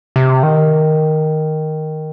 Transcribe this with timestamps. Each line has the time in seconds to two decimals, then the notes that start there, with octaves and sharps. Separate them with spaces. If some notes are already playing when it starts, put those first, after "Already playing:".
0.16 C3
0.43 D#3